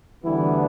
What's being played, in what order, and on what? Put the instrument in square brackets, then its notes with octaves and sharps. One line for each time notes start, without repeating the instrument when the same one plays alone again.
[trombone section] D2 D3 E3 G3 B3 E4